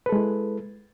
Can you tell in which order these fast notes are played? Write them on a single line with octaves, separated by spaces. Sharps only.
B4 A4 G#3 E4